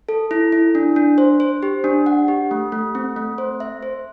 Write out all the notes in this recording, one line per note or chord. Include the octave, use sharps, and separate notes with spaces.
A4
E4
E4
D4
D4
C5
C5
G4
D4
F#5
G4
A3
A3
C4
A3
C5
E5
C5